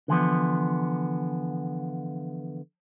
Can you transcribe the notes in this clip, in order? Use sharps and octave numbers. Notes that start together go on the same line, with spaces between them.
D3 E3 F3 B3